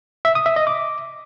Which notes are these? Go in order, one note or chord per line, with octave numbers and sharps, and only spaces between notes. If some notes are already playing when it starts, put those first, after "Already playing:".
E5
D#6
E5
D#5
D6